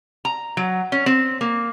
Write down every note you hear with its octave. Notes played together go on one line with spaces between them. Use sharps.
A#5
F#3
C#4
C4
A#3